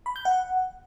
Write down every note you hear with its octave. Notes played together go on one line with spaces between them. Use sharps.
B5
G6
F#5